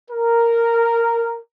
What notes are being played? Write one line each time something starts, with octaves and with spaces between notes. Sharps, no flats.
A#4